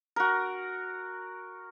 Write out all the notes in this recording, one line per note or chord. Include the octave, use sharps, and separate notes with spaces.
F#4 A#4